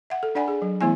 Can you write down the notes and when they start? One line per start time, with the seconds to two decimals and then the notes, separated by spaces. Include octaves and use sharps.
0.10 E5 F#5
0.23 A4
0.35 D4 D5 F#5 G#5 B5
0.48 G#4
0.62 F#3
0.81 E3 A3 B3 E4 G#5